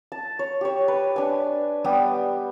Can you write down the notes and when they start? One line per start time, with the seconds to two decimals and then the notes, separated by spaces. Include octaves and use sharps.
0.12 A5
0.39 C#5
0.61 G4 C#5
0.88 B4
1.16 D4 G#5
1.84 G3 B3 G4 D#6